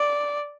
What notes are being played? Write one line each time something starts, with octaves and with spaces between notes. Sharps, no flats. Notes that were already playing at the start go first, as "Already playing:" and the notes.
Already playing: D5